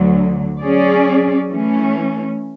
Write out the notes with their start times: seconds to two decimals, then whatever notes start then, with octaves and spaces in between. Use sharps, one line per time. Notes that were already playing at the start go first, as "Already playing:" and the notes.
Already playing: D2 D3 F#3
0.61 F#3 C#4 G#4 D5
1.50 E3 A3 C#4